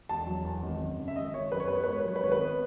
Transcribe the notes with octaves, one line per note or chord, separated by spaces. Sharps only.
E1 A5
F#3
E2
G#1
F#2
C#3
E5
G#1 D#5
G#1 C#5
F#2 B4
C#5
B3 B4
C#5
B4
G#2 C#5
B4
F#3 C#5
B4
G#1 C#5
B4
B3